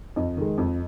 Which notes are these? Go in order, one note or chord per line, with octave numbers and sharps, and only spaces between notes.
F2 D#5
D#3 G#3
F2